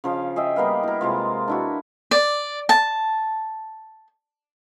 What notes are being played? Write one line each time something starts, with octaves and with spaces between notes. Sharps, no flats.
C#3 F3 F5
G#4 D#5 E5 G5
G3 A#3 B3 F5
E4 A#4
C3 G#3 F4
D4 E4 F#4
D5
A5